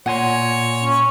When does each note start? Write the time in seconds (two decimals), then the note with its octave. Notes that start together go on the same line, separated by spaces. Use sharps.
0.06 A#2 C#5 F#5 G#5 C6
0.84 C#4